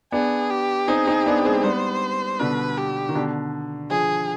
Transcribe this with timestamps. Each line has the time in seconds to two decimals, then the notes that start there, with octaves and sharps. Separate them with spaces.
0.12 B3 D4 G#4
0.51 G4
0.88 C4 D#4 G#4
1.07 C4 D#4
1.26 B3 D4
1.45 G#3 C4
1.63 G3 B3 C5
2.39 B2 D3 B4
2.78 G4
3.09 D#3
3.15 B2 D3
3.91 D3 F3 G#4